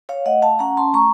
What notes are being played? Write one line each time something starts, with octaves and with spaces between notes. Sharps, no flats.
C#5 F5
A3 D#5 F#5
F5 A5
C#4 F#5 A#5
A5 C6
A3 A#5 C#6